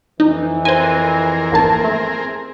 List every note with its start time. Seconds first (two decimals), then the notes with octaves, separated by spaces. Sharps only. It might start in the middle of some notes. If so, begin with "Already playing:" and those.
0.20 F2 E3 D#4
0.65 C4 G#4 A#4 C5 G#5
1.52 G#1 A#3 A5
1.84 A3